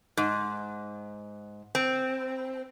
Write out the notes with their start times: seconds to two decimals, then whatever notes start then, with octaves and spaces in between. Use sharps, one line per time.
0.17 G#2
1.75 C4